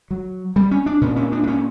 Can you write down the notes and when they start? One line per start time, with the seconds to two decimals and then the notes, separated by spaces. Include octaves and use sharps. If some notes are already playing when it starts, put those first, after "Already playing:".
0.11 F#3
0.56 G3
0.71 C#4
0.86 D4
1.01 A#2 C#4
1.16 C#4
1.32 D4
1.43 D4
1.47 C#4